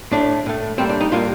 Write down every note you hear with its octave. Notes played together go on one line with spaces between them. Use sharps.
A2 A3 D4
A2 A3
A2 G3 A#3 C4
D4
D#4
A2 G3 A#3 F4